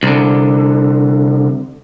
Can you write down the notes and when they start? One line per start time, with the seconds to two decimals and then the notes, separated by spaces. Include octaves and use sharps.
0.03 C2 D3